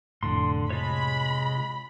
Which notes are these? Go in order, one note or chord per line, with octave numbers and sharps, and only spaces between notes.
F1 F2 A2 D3 C6
C3 G#3 F4 C#5 B5